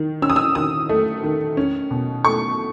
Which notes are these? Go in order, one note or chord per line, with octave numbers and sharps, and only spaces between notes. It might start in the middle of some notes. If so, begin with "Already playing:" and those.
Already playing: D#3
C#4 E6
D#6
E6
D#3 D#6
A3
D#3
C#4
B2
A3 C#6